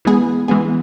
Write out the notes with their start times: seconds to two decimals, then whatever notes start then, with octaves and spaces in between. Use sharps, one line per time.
0.05 E3 G#3 B3 G#4
0.48 E3 G#3 B3 G#4